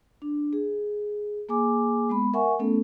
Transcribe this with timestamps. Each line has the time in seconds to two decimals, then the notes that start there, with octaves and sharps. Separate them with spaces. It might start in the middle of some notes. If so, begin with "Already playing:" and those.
0.22 D4
0.53 G#4
1.49 A#3 G#4 G#5 D6
2.09 G#3 B3 B5
2.34 A#4 E5 F#5 G#5 C#6
2.59 A3 B3 C#4 A4